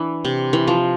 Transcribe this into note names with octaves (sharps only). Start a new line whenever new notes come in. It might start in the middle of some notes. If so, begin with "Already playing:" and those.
Already playing: E3 D4
C3
E3
F3